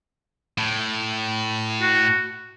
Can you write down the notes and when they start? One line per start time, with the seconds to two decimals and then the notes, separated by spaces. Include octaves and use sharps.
0.58 A2
1.82 F#4